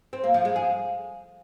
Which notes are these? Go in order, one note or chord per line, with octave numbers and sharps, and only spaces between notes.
C4
A#3
F3
G#3
G#4